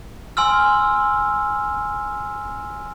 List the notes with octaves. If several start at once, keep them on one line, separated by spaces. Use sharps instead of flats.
G#5 C6 E6 F6